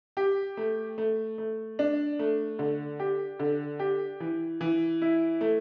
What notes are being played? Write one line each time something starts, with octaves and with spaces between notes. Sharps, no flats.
G4
A3
A3
A3
D4
A3
D3
G4
D3
G4
E3
E3
E4
A3